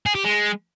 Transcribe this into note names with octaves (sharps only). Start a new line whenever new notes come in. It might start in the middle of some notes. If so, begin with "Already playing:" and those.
G#4
G4
G#3